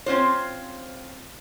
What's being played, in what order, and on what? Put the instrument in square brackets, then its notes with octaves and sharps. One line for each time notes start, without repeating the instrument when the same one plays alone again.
[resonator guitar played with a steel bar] C4 C#4 F4 C5